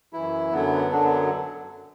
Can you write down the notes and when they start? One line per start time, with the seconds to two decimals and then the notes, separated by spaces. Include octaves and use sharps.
0.13 F#2 E3 E4
0.52 F#2 D3 F#3 B3
0.91 F#2 D3 F#3 D4
1.04 B3